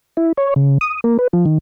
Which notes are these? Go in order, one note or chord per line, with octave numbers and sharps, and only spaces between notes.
E4
C#5
C#3
D#6
A#3
B4
F3
D#3